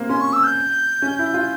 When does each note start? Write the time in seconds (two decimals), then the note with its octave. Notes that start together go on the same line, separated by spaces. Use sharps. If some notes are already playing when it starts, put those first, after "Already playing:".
Already playing: A#3 C4
0.09 C#4 C6
0.21 C#6
0.33 E6
0.44 G6
1.02 C#4
1.19 E4
1.34 F4